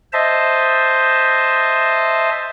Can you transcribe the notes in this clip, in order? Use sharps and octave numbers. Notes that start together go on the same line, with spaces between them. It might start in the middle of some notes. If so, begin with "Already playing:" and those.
C5 D#5 E5 A5